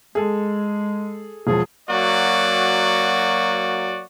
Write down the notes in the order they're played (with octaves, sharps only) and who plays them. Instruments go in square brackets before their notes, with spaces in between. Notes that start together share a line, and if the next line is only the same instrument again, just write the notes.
[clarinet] G#3 [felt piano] G#4 A4
[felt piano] E1 F3 [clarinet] G#4
[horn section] F#3 A#3 F#4 D5